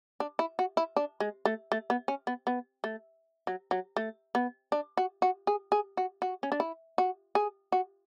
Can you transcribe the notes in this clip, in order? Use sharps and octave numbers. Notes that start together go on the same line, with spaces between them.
D4
E4
F#4
E4
D4
G#3
A3
A3
B3
C#4
B3
B3
A3
F#3
F#3
A3
B3
D4
F#4
F#4
G#4
G#4
F#4
F#4
C#4
D4
E4
F#4
G#4
F#4